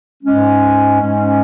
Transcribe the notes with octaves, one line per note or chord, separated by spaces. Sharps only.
G#2 G#3 C#4
G#2 G#3 C#4